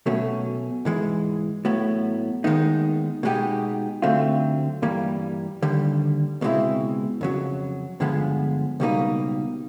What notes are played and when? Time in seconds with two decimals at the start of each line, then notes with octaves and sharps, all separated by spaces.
0.06 B1 B2 F#3 A3 C#4
0.85 G#2 E3 G#3
1.65 A2 F#3 B3
2.44 D#2 D#3 G#3 B3 D#4
3.23 B2 G#3 B3 D#4 G4
4.02 D3 F#3 A3 C4 F4
4.82 G2 E3 G3 A#3
5.62 D#2 D3 G3
6.41 C#2 B2 G#3 C4 E4
7.21 F2 C#3 F#3
8.00 G2 D3 F3 G#3 B3
8.80 C#2 B2 G3 A#3 D#4